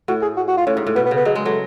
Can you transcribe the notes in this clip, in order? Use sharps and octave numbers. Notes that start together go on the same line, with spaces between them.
A2 F#4
G#4
F#4
F#4
F4
A2 C#4
G#2
A2
B2 B3
B3
C#3
B3
F#3 G#3
G#3
F#3 A3